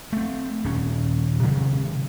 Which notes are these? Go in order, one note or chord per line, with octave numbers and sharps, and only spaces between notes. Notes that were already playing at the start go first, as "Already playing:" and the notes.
A3 C4
D#1 C#4
C3 D#3 F#3 G#3